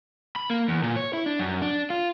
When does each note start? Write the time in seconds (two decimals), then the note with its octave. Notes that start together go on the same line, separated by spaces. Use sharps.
0.36 B5
0.50 A#3
0.68 E2
0.83 A#2
0.96 C#5
1.13 E4
1.26 D4
1.39 F#2
1.62 D4
1.90 F4